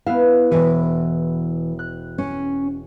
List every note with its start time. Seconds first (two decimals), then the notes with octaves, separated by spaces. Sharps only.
0.06 B3 E4 F5
0.51 E1 E3 B4 D#5
1.79 F#6
2.18 C#4